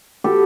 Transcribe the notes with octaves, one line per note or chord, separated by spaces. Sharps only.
B3 G4 A4